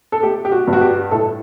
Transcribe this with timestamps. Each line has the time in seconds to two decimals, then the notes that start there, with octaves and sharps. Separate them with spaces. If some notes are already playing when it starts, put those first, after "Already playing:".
0.12 A4
0.23 A3 G4
0.45 G4
0.52 F#4
0.68 G2
0.73 F#4
0.81 G4
1.11 A2 A4